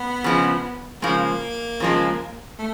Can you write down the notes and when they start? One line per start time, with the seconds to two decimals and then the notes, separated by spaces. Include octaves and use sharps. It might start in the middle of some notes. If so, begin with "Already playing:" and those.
Already playing: B3
0.24 C#3 F3 G#3
1.02 C#3 F3 G#3 A#3
1.80 C#3 F3 G#3
2.59 A3